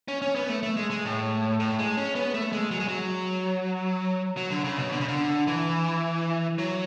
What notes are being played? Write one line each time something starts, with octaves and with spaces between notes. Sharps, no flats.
C#4
C#4
B3
A3
A3
G#3
G#3
A2
A2
G#3
C#4
B3
A3
G#3
F#3
G#3
F#3
F#3
D3
C#3
B2
D3
C#3
D3
E3
F#3